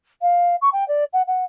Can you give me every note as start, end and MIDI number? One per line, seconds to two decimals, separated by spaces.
0.22 0.56 77
0.62 0.69 85
0.73 0.87 79
0.88 1.04 74
1.13 1.22 78
1.27 1.45 78